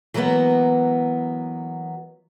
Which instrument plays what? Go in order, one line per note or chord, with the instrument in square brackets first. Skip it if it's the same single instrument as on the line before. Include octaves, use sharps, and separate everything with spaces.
[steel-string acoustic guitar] E3 F#3 G#3 A#3 B3